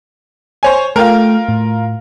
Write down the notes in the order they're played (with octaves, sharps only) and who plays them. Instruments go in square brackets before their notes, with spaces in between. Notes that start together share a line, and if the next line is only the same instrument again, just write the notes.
[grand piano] C5 C#5 G#5
[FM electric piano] A3 G5 F6 [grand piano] F4 A#4
[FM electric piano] A2